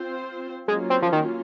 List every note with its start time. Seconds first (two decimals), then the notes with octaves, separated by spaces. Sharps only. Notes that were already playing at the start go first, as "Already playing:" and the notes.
Already playing: C4 F4 C5
0.68 F#3 G#3 A#3 C#4 F4
0.90 C4
1.02 F3
1.12 D#3